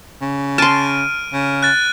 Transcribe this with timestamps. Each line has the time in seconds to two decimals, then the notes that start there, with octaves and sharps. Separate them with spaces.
0.21 C#3
0.58 A5 C6 F6 D7 D#7
1.33 C#3
1.63 F#6 A6